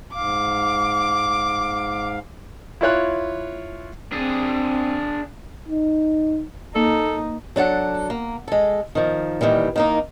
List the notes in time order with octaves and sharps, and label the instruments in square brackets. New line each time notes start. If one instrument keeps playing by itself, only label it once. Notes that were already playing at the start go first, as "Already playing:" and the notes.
[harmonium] G#2 F5 [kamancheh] D6
[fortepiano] E4 F4 C#5 F#6
[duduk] C4 [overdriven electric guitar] D4 G#4
[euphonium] D#4
[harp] A#3 [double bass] D#4 [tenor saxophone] A4
[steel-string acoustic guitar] F#3 D4 A4 F#5
A#3
G#3 A4
D#3 F3
A#2 D#3 E3 G3
D#3 A#3 D#4